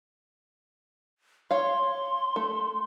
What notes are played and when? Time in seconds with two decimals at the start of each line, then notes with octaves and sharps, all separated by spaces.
1.51 C#5 F5 C6
2.36 A3